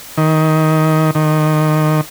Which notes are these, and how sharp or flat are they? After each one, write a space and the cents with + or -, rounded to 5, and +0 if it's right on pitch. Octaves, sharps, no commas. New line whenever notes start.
D#3 +15
D#3 -15